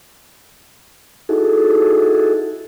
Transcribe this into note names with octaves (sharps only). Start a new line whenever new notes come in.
D#4 E4 F#4 G#4 A4